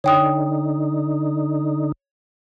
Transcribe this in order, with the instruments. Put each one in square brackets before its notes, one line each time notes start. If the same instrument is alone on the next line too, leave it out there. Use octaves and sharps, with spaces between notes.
[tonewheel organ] D3 D#4 [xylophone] C#5 G5 D#6